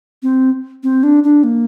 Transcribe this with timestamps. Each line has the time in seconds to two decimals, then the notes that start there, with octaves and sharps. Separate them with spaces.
0.23 C4
0.83 C4
1.03 D4
1.24 D4
1.44 A#3